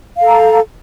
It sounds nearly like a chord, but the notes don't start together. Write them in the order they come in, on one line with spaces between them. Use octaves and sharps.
F5 A4 A#5